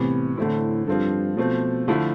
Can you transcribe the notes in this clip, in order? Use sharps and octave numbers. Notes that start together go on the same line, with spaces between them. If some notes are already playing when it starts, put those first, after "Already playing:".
Already playing: A2 C3 E3 B3
A2 D3 A3 C4 E4
G2 F3 C4 F4 A4
B2 F3 A3 C4
D3 F3 A3 E4